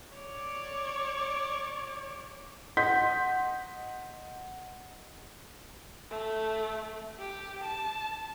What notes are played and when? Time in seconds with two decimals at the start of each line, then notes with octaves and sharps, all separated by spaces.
0.16 C#5 D5
2.77 D#5 F#5 C6 G6 B6
6.11 A3
7.19 G4
7.63 A5